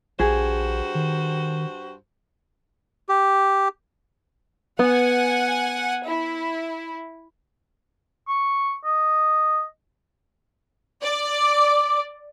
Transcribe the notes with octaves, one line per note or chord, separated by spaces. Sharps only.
A#1 G2 F#4 G#4 C5
D#3
G4
B3 F#5 G#5
E4
C#6
D#5
D5
D6